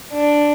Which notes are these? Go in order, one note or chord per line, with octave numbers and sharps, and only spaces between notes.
D4